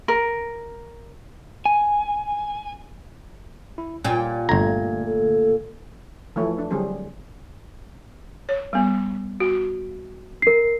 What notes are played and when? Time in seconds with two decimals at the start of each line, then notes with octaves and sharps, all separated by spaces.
0.08 A#4
1.66 G#5
3.78 E4
4.04 A#2 G4 G#5
4.49 G1 D3 A3 A#5 G#6
5.04 A4
6.36 E3 F3 A3 E4 C#5
6.58 D4
6.70 D3 F#3 G3 C4 G#4 C5
8.49 C#5
8.73 G3 B3
9.40 F#4
10.42 A#4 C7